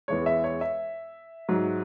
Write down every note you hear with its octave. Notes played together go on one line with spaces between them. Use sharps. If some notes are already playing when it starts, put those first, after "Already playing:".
E2 E3 G#3 C#5
E5
C#5
E5
G#2 F#3